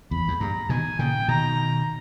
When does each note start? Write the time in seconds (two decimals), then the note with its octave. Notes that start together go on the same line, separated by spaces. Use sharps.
0.11 E2 B5
0.28 E2
0.40 G2 A#5
0.69 B2 D#3 G#5
0.99 A#2 C#3 G5
1.28 B2 D#3 A#5